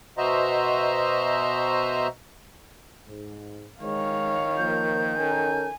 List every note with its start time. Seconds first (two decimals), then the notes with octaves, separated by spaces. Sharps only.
0.18 B2 F#4 C5 D#5 E5 A#5
3.06 G#2
3.81 D#3 G#3 C#5 F5
4.57 F3 A#3 G6
5.18 C#4 A4 A#4 G#5